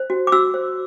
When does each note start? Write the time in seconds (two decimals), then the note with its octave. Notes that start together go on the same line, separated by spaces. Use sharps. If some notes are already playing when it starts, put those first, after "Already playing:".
Already playing: C5
0.10 F#4
0.27 D6
0.32 F#4 E6
0.54 C5